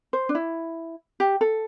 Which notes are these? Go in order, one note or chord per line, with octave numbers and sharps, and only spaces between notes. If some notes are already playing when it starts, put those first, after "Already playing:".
C5
D4
E4
G4
A4